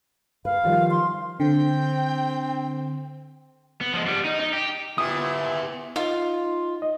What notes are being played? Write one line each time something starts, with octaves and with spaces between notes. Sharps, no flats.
B4 F5
D#3 F3 G3
C6
D3 C4 G5
B3
F3 G#3
G3 B3
D#4
D#4
G4
A#2 B3 E4 G4 E5 D#6
D#4 F4
D#5